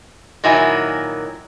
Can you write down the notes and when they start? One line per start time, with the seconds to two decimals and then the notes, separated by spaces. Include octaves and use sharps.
0.44 A#2 D#3 F#3 E4 G#5